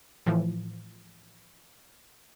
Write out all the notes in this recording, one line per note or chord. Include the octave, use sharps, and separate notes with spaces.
A2 E3 F3